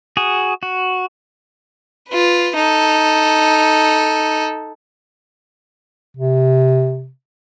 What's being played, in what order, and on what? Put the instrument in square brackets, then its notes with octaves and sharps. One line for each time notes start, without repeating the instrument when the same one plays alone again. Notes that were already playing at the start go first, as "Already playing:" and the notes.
[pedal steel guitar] F#4 G#4
F#4
[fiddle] F4 B4
D#4 A4
[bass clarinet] C3